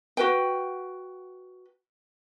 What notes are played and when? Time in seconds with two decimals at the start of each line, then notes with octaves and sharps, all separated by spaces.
0.17 F#4 B4 G5